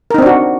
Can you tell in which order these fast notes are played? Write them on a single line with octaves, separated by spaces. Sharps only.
A#4 D#4 C4 D4 F#4